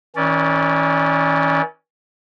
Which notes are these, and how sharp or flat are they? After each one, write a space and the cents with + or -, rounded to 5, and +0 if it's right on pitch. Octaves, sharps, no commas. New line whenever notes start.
E3 -45 C#4 +0 D5 -15